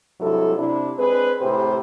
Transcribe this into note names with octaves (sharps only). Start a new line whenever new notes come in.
G2 C3 F#3 G#3 E4 A4
C3 D4 E4
G#3 C4 D4 G#4 B4
A2 C3 G4 G#4 B4 C5